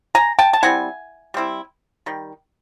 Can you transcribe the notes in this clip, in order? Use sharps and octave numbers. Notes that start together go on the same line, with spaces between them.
G#5 A#5
G5 A5
A5
G3 C4 E4 F#5 G#5
G3 C4 E4
D#3 G3